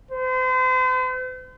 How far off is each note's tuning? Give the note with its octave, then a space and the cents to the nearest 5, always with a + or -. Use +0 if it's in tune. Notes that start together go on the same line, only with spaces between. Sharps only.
C5 -40